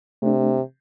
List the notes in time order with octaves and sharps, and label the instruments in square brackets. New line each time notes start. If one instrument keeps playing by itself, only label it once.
[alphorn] C3 [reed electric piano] A3 D4